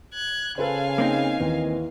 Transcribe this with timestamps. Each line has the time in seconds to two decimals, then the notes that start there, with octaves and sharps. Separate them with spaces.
0.14 F#6 G#6
0.58 C#3 A4 B4 C5 F5 G#5
0.98 A#3 C4 D#4
1.40 D#2 E3